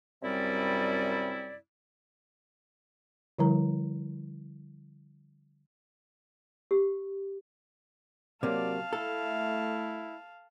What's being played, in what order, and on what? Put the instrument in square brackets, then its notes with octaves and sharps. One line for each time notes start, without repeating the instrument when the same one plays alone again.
[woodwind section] F#2 C3 G3 C4 E4 D5
[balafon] D3 F3 G3 E4 A#4 A#5
[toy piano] G4
[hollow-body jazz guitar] C3 A#3 [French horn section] F#3 [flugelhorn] D5 [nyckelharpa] F5 A5
[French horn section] A3 [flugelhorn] E4 [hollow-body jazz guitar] A4